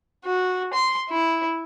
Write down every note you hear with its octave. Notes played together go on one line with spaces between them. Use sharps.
F#4
C6
E4